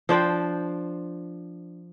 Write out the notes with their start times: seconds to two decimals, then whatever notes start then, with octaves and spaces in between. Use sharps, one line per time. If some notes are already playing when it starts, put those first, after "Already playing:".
0.09 F3 D4 C5 G5